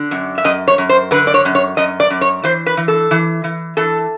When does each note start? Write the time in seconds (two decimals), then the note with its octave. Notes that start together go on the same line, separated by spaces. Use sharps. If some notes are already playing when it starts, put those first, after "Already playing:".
Already playing: D3
0.11 F#2
0.38 E5
0.44 F#2 D#5
0.68 C#5
0.78 F#2
0.89 C5
1.11 D3 B4
1.27 D5
1.34 C#5
1.45 F#2
1.55 C#5
1.77 F#2 D#5
2.00 D5
2.10 F#2
2.21 C#5
2.43 E3 C5
2.66 B4
2.77 E3
2.88 A4
3.11 E3
3.44 E3
3.77 E3 A4